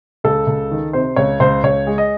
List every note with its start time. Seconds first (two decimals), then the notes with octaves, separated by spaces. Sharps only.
0.24 C#2 A4
0.47 C#2
0.71 D#3
0.93 C3 C5
1.16 C#2 C#5
1.40 C#2 C5
1.63 C#2 C#5
1.87 G#3
1.98 D#5